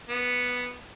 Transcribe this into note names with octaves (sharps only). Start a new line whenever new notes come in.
B3